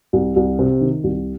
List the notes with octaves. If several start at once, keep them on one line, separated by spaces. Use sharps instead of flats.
C2
C2
C3
D#3
C2